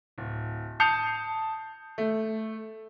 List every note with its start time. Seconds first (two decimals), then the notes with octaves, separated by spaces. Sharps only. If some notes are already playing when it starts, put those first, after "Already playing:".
0.18 D1
0.80 A5 D#6 G6 C7 C#7 F7
1.98 A3